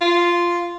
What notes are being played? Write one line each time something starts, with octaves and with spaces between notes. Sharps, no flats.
F4